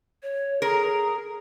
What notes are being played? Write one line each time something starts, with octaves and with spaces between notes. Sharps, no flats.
C#5
G#4 A#4